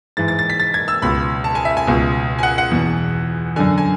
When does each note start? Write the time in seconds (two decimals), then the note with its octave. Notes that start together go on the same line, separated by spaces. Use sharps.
0.17 G#2 E3 A6
0.28 A6
0.39 A6
0.50 B6
0.60 A6
0.74 G#6
0.88 E6
1.02 C#2 B2 B5
1.44 A5
1.55 G#5
1.65 E5
1.77 G#5
1.87 C#2 B2
2.39 G#5
2.43 F#5
2.58 F#5
2.71 E2 B2
3.56 F#2 D3 G#5
3.78 G#5